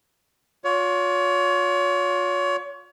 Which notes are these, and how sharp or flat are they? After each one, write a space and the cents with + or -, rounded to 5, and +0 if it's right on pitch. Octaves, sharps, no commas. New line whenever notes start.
F4 +35 C#5 +35